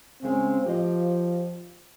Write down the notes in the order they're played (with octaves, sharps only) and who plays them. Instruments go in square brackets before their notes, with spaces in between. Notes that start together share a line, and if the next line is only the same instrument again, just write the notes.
[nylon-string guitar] C#3 G#3 C#4 [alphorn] C4
[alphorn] F3 [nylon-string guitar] G4 D#5 F5